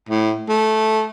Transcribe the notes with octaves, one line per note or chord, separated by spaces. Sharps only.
A2
A3